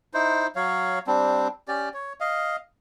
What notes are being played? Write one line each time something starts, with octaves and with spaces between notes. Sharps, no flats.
D#4 E4 C5
F#3 C#5 F5
G3 C4 D4
C#4 G4 D5
C#5
D#5 F5